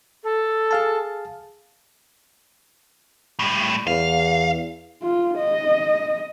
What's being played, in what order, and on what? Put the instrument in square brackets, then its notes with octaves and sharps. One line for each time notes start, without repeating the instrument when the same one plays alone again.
[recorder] A4
[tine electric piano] G#4 F5 A5
[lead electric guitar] A2 G3
[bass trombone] E2 [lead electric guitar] F5
[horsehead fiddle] F4
D#5